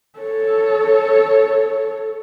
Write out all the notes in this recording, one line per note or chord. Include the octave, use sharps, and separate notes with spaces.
A4 C#5